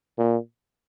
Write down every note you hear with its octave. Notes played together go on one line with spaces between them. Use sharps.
A#2